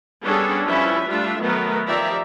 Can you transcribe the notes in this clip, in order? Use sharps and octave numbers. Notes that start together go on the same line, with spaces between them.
G3 B3 C#4 D4 G#4 A4
F3 G3 C#4 E4 B4 E5
G3 A3 D4 F4 E5
D#3 F#3 A3 B3 A#4 B4
D#3 F3 G4 D5 E5 A#5